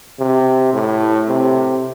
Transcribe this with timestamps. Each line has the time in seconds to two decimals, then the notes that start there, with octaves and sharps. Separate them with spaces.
0.20 C3
0.73 A2
1.28 C3